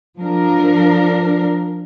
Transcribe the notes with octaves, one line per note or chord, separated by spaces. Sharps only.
F3 D4 A#4